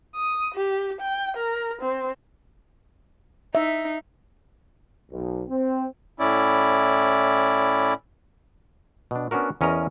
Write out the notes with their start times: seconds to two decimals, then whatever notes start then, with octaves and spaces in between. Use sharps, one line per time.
0.15 D#6
0.54 G4
1.01 G5
1.37 A#4
1.81 C4
3.55 D#4 E5
5.11 B1
5.48 C4
6.20 A2 C#4 E4 D5
9.11 B2 D4
9.31 B3 C#4 D4 F#4 A#4
9.61 E2 C#4 A#4 D#5 A#5